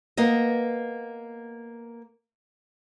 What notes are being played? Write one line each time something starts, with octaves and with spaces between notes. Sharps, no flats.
A#3 B3 D#5